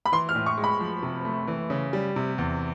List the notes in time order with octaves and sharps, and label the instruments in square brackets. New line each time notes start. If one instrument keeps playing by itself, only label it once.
[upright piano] B5
[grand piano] E3 [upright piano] C6
[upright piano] F6
[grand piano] A2
[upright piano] C#6
[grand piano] G#3
[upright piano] B5
[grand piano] F3
C3
A3
E3
C#3
G3
C3
E2